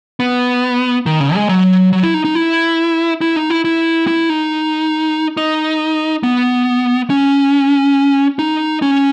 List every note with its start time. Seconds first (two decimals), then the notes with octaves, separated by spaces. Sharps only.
0.20 B3
1.06 D#3
1.20 C#3
1.35 G#3
1.49 F#3
1.93 F#3
2.03 E4
2.14 D#4
2.25 D#4
2.35 E4
3.21 E4
3.36 D#4
3.50 E4
3.65 E4
4.08 E4
4.29 D#4
5.37 D#4
6.23 B3
7.10 C#4
8.39 D#4
8.82 C#4